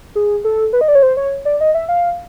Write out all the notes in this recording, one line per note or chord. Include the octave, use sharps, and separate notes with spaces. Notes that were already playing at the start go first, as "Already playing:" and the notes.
G#4
A4
B4
D#5
D5
C#5
C5
C#5
D5
D#5
E5
F5